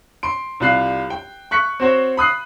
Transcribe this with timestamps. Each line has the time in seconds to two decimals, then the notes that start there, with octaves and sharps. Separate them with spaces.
0.23 C6 D7
0.60 C2 G3 F4 F#6 C7
1.10 G5
1.51 C#6 F#6 B6 C#7
1.80 C4 F#4 C5 C#5
2.17 B5 D#6 F#6 C7